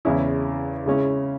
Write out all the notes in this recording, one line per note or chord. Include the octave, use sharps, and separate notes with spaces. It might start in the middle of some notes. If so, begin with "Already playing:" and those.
E2 C#3 G#3 C#4 E4
C#3 G#3 C#4 E4